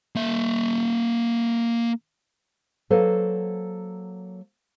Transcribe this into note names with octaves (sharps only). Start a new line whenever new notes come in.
A#3 E5
F#3 A#3 A4 B4 C5